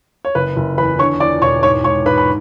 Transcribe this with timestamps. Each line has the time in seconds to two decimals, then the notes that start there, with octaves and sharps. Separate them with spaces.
0.25 C#5
0.35 F#1 B4
0.56 F#1
0.78 E2 B4 B5
0.99 D3 C#5 C#6
1.20 E2 D5 D6
1.42 E1 C#5 C#6
1.63 G#2 C#5 C#6
1.84 G#2 C#5 C#6
2.06 G#2 B4 B5
2.18 B5